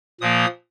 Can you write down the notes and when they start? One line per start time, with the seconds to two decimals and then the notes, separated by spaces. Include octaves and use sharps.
0.21 A#2 F3 A#3 D#6